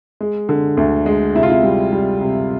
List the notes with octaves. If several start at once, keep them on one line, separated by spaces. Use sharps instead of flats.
G#3
D3
D2
G#3
C3 E4
F4
E4
G3
G3
C3